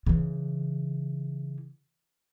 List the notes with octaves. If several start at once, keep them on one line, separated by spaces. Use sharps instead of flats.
C#3 E3